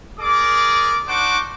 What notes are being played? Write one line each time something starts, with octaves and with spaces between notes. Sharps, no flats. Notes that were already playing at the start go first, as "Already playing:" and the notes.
G#4 A#4 D5 D6
D4 D#4 C5 F#5 C#6 D6